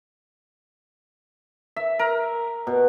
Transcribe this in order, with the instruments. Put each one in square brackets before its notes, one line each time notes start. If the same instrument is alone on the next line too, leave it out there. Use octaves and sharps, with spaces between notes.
[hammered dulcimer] E5
A#4
B2